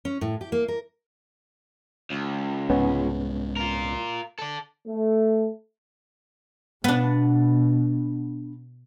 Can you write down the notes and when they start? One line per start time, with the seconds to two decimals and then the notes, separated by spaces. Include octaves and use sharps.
0.05 C#4
0.21 A2
0.41 G4
0.52 A#3
0.68 A#4
2.10 C#2
2.70 C2 G#2 G#3 B3 C#4
3.57 F4 A#4
4.39 A4 D5
4.88 A3
6.84 B2 B3 D4